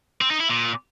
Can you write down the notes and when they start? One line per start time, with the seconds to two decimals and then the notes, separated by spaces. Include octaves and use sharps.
0.21 C4
0.31 D#4
0.40 E4
0.50 A#2